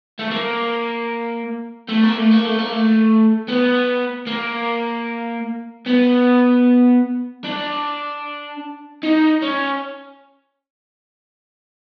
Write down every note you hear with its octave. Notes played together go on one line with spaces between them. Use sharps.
A3
A#3
A3
A#3
A3
A#3
A3
A#3
A3
B3
A#3
B3
D4
D#4
C#4